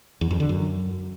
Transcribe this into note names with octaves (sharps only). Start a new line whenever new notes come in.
E2
F2
D3
F#2